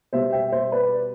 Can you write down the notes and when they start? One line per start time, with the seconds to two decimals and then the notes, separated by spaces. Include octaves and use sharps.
0.13 B2 G3 C5 E5
0.32 E5 G5
0.52 C5 E5
0.72 B4 D5